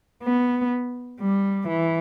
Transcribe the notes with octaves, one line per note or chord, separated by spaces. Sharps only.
B3
G3
E3